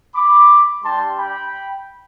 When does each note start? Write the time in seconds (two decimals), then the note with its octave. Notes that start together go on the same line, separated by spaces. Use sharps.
0.15 B5 D6
0.84 G3 D4 G4 A5 C6
1.19 G5 B5